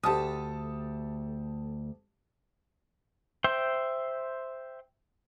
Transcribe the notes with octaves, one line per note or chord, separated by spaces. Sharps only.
D2 G4 A4 A5 D#6
C5 E5 G5 C6